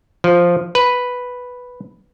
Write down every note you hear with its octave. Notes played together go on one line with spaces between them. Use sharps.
F3
B4